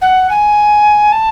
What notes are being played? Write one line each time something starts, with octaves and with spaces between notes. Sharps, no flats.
F#5
G#5
A5